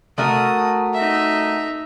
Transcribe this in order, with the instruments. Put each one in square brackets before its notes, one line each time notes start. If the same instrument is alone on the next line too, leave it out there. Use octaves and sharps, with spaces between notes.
[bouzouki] A3 F#4 A#4 [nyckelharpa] D#6
[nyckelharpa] D#4 E5